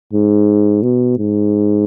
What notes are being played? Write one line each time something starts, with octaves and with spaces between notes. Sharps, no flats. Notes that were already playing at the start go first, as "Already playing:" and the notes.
G#2
B2
G#2